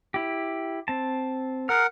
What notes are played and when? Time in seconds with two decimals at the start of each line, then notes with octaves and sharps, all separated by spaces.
0.14 E4 G4
0.88 C4 A5
1.69 G#4 A#4 F#5 F6